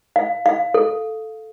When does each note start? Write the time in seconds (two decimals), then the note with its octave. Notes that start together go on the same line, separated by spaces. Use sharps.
0.16 F5
0.46 F5
0.74 A4